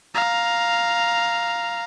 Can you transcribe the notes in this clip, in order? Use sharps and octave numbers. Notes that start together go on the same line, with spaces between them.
F5 A#5